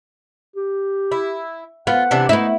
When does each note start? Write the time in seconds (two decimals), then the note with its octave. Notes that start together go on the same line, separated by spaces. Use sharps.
0.56 G4
1.12 E4
1.87 B3 F4 F#5
2.11 C3 E3 D4
2.29 A3 B3 D#4 E4